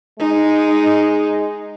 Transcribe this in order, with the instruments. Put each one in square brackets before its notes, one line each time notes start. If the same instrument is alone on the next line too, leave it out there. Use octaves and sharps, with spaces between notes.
[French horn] G#3 [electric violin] D#4